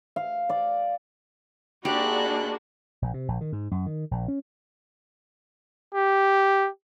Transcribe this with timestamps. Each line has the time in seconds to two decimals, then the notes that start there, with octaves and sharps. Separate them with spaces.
0.16 F5
0.49 D5
1.85 G#2 A#3 D4 F#4 G4 B5 F#6
3.02 A#1
3.14 C3
3.28 A#1
3.41 D#3
3.52 G#2
3.71 F#2
3.86 D#3
4.11 A#1
4.28 C#4
5.95 G4